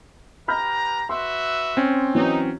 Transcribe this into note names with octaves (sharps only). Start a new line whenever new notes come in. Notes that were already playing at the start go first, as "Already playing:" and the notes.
G4 B4 A#5 B5 F6 G6
F#4 B4 E5 C6
C4 C#4
E3 F#3 D#4